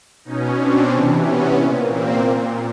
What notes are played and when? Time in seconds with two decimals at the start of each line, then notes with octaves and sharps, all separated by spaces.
0.25 B2 C#4 D#4
0.57 C4 D4
0.90 C3 E3
1.22 B3 C#4
1.55 A#2
1.87 A#3 C4
2.20 A#2